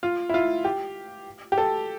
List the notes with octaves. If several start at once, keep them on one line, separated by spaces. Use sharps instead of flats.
F4
E4
F4
G4
G4
A4